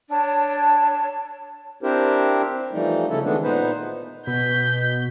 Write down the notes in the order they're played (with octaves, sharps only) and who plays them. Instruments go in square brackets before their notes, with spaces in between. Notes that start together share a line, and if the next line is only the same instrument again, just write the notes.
[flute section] D4 C#5 A5
[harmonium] C4 D4 E4 G4 A#4 C5
E3 F3 G3 A3 D#4
C#3 A3 C#4 E4 A4
D#3 E3 G#3 A3 B3 D4
A#2 B3 D#4 B4 C5
[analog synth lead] B2 [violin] G6 B6